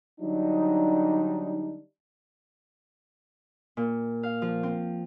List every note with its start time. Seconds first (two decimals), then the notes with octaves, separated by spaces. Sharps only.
0.21 D3 F#3 G3 D4 D#4
3.77 A#2
4.23 F5
4.42 F3
4.63 C4